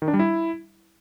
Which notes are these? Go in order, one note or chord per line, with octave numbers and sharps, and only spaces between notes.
D#3
D4
G3
E4